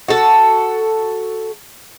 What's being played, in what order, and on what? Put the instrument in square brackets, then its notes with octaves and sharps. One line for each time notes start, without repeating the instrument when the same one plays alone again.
[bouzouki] F#4 A4